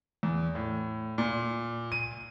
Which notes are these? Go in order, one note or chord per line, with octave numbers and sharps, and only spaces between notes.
E2
A2
A#2
D#7